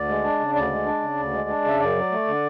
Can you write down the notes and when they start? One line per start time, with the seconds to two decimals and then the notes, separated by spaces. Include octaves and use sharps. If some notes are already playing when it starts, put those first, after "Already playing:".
Already playing: D2 D5
0.08 G#3
0.24 D4
0.39 C#3
0.55 D2 D5
0.71 G#3
0.86 D4
1.01 C#3
1.18 D2
1.33 G#3
1.49 D4
1.64 C#3 E5
1.80 F#2 D5
1.96 F#3
2.11 A3
2.27 D3